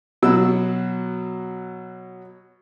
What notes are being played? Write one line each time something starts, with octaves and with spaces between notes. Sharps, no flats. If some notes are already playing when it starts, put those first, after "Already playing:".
B2 F#3 E6